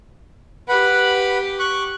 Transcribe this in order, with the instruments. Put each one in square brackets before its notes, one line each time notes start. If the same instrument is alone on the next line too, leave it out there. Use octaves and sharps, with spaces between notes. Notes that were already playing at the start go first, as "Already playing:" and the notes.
[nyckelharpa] G4 [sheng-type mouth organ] B4 F#5 B5
[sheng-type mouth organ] C#6 F#6